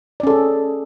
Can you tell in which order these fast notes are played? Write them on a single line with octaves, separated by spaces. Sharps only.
D5 C#4 A4 G#4